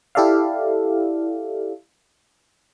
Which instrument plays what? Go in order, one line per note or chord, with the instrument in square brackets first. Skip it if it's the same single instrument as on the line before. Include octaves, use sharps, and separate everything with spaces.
[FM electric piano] E4 G4 A4 D5 E5 F5